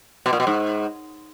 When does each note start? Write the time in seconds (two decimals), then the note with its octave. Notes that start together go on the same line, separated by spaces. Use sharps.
0.26 B2
0.33 A#2
0.40 B2
0.47 G#2